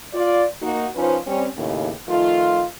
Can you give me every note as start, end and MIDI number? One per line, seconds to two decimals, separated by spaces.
0.14 0.44 65
0.14 0.44 74
0.62 0.86 58
0.62 0.86 63
0.62 0.86 66
0.95 1.17 53
0.95 1.17 61
0.95 1.17 63
0.95 1.17 65
0.95 1.17 71
0.95 1.17 72
1.27 1.46 55
1.27 1.46 60
1.27 1.46 61
1.57 1.90 39
1.57 1.90 45
1.57 1.90 49
2.09 2.63 51
2.09 2.63 53
2.09 2.63 57
2.09 2.63 65